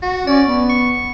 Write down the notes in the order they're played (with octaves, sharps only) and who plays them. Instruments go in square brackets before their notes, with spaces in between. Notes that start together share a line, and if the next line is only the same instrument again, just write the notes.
[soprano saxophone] F#4
[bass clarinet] C#4 [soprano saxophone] D5
[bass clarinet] B3
[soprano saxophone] C#6